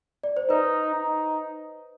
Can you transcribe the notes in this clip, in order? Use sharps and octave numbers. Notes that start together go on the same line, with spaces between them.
D5
C5
D#4 B4
D#4